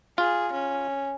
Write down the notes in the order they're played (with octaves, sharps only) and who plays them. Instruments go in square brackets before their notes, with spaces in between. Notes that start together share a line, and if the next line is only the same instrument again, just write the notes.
[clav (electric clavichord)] F4 [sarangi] G#4
[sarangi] C#4